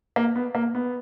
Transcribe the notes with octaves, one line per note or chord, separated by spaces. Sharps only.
A#3
B3
A#3
B3